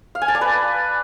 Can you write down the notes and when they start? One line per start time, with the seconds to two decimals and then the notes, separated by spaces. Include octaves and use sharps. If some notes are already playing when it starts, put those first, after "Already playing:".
0.15 F5
0.22 G#5
0.28 A5
0.35 D5
0.41 B4